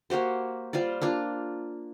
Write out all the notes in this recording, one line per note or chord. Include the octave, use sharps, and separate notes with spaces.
A#3 F#4 G4 C5
G3 F4 C5 D5
A#3 D4 F4